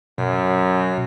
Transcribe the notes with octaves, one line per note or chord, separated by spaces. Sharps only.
F#2 B2